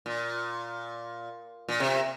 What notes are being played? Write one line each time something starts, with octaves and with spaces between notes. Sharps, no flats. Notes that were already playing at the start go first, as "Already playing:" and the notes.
A#2
A#2
C3